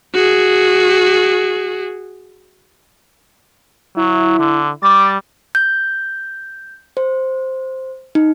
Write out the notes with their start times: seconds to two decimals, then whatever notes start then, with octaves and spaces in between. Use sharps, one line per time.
0.14 F#4 G#4
3.97 F#3 E4
4.39 D3
4.83 G3 D6 A6
5.55 G6
6.97 C5
8.15 D#4